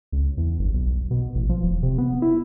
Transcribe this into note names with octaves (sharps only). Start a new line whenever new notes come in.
C#2
E2
G1
B1
B2
A1
F3
E1
C3
B3
E4